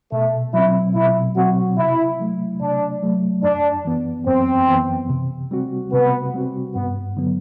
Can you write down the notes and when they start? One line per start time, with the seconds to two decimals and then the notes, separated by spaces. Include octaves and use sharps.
0.12 B2 A3
0.54 F#3 C4 E4
0.95 B2 E4
1.37 F#3 C4 F#4
1.78 C3 E4
2.20 F#3 A3
2.61 C3 D4
3.03 F#3 A3
3.43 F#2 D4
3.85 E3 B3
4.27 F#2 C4
4.68 E3 B3
5.10 C3
5.51 G3 C4 F#4
5.92 C3 B3
6.34 G3 C4 F#4
6.75 G2 B3
7.17 D3 F#3 B3